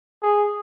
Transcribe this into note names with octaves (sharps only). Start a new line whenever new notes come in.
G#4